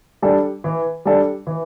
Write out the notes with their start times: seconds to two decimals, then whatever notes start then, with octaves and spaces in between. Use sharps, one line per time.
0.22 G3 D4 A4
0.64 E3
1.05 G3 D4 A4
1.47 E3